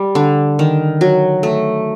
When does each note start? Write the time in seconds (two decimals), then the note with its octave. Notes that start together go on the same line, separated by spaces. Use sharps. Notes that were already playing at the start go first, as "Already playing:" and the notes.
Already playing: G3
0.15 D3
0.59 D#3
1.01 F#3
1.43 A3